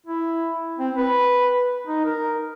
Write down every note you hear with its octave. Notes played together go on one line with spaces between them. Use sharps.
E4
C4
B4
D#4
A#4